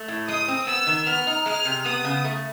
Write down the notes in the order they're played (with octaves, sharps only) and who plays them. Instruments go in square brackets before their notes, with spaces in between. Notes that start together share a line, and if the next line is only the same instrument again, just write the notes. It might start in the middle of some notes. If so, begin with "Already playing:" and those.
Already playing: [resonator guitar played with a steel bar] A3
A2
[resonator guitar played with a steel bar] G#3 [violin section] D#6
[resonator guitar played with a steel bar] C4
[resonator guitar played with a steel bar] B3 [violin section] E6
[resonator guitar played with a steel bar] D#3
[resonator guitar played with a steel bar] B3 [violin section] F6
[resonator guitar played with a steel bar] D#4
[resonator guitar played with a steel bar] G#3 [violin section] F6
[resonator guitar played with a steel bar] C3
[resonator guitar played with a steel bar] B3 [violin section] D#6
[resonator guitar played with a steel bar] C#3
A3